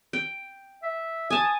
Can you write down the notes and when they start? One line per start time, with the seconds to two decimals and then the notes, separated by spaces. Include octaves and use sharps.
0.13 G5
0.83 E5
1.30 G#5 A5 D#6